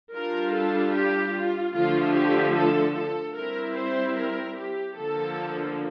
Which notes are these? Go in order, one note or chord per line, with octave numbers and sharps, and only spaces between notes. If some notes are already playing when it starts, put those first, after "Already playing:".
G3 D4 F4 A#4
A4
G4
F4
D3 F3 A3 F4
G4
A4
A4
G3 C4 E4 A#4
C5
A#4
G4
D3 F3 A#3 A4